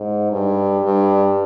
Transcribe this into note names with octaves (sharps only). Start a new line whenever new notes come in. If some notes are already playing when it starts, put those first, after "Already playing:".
Already playing: G#2
G2
G2